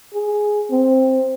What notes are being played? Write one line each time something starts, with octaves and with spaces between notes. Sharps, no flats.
G#4
C4